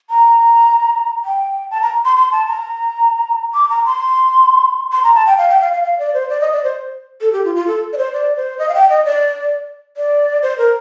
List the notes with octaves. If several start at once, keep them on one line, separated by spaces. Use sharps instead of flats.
A#5
G5
A5
A#5
C6
C6
A5
A#5
D6
A#5
C6
C6
A#5
A5
G5
F5
G5
F5
F5
F5
D5
C5
D5
D#5
D5
C5
A4
G4
F4
F4
A4
D5
C5
D5
C5
D#5
F5
G5
D#5
D5
D5
C5
A#4